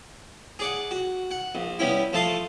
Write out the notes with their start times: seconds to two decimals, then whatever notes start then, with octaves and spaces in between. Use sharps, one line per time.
0.59 G#4 D5 F#5
0.91 F#4
1.31 F#5
1.55 A#1
1.79 G3 B3 C#4 E4
2.13 F3 A3 A5 C6 D#6